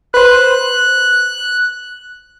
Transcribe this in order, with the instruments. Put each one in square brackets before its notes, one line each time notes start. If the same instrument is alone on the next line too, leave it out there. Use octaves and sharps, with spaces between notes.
[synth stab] B4 C5 [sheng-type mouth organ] F#6